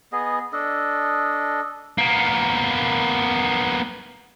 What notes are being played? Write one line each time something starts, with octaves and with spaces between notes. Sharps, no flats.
B3 G#4 D#5
D4 A4 D#5
A#3 B3